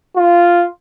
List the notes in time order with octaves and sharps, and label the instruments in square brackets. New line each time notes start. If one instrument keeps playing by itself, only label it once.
[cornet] F4